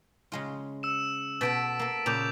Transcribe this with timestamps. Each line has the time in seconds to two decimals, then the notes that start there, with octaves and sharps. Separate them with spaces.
0.32 C#3 G#3 F4
0.83 E6 E7
1.41 B2 F#4 A4 A6 B6 D7
1.79 A#3 A4
2.06 A#2 C#3 D6 G6 F7